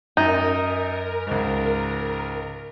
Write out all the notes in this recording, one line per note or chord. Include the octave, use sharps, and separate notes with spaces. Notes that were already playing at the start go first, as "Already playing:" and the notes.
F#2 D#4 A#4
C#2 G#2